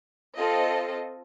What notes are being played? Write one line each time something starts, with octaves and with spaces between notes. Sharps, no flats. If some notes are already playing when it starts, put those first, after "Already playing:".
C4 F4 A4 D#5